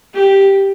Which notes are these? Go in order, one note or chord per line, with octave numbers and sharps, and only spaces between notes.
G4